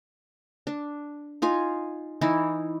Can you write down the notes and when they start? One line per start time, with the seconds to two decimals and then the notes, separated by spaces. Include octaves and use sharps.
0.67 D4
1.42 D#4 F4 G#5
2.21 E3 D#4 E4